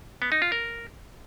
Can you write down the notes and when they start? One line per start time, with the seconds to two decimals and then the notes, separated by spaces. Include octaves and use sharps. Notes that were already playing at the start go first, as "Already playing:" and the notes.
0.22 B3
0.32 D#4
0.42 F4
0.52 A#4